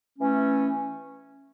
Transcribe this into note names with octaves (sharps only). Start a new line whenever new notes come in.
E3 A3 C#4